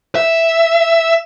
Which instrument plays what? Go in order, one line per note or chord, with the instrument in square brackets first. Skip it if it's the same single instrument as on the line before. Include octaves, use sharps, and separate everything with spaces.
[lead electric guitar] E5